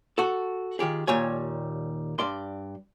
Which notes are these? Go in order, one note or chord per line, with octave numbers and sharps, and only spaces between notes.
F#4 A4
D#3 F4 G4 G#4
D#2 A#2 G3 C#5 G#5
G2 D5 C6